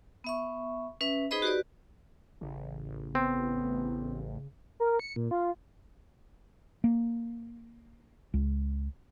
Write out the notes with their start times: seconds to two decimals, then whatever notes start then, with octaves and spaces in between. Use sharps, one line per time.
0.24 B3 E5 C#6
1.01 C#4 B4 E5
1.31 D#4 G#4 B4 C5 D#5 B5
1.42 F#4 G4 B4 D5
2.41 A1 C#3
3.15 B3 C4
4.80 A#4
5.00 C#7
5.16 A#2
5.31 F4
6.84 A#3
8.34 C#2